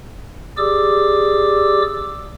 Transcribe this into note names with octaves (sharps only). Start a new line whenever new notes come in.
G4 G#4 D5 D6 E6